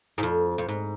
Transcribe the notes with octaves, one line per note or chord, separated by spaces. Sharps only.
G#2
F2
F2
G#2